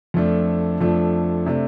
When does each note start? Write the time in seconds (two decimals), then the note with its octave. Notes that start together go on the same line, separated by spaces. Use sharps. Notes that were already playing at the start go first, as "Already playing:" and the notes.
0.14 F2 F3 A3 D4
0.80 F2 F3 A3 D4
1.46 C3 A3 D4